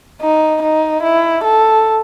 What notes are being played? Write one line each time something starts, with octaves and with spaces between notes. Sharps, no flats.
D#4
D#4
E4
A4